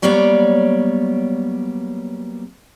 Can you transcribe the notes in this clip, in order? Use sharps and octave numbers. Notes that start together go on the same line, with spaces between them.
F#3 G3 A#3 B3 C#5 D5